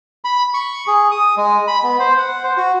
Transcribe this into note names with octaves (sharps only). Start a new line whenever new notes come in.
B5
C#6
G#4
D#6
G#3
B5
B3
C5
F#5
C5
F#4